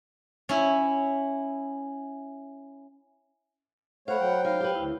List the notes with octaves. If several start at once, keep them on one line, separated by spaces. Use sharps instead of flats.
C#4 E4
A3 C5 C#5 F5 F#5 B5
F#3 G5
D#4 F5
G4 B4
D2 E4